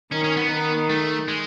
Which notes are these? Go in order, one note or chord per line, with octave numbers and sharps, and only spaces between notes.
D#3 C#4
C#4
B3
D#3
A3
G#3